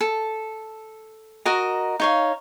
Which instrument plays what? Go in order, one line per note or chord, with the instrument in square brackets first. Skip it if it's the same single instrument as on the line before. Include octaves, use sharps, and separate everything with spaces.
[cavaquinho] A4
F#4 A#4 D#5 A#5
D#4 C#5 F5